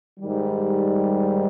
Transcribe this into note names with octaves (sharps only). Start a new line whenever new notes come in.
G#2 D#3 G3